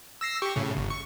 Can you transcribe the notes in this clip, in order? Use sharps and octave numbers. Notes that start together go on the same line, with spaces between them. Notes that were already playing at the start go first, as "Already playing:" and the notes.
E6 A#6 C7
G4 C#6
A2 C#3
G1
C#6